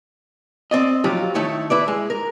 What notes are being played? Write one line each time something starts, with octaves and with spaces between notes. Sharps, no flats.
C4 D5 D#5
F3 F#3 F4 G4
D#3 A3 E4 A4 C#5
E4 B4 D5
G#3
A#4